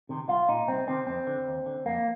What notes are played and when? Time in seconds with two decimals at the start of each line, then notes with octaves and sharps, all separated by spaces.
0.09 C3 D#3
0.28 C2 F4
0.48 A#2 D#4
0.67 C2 C4
0.87 C3 D#3 C4
1.07 F2 C4
1.27 D3
1.47 D#2
1.66 D3
1.86 F2 A#3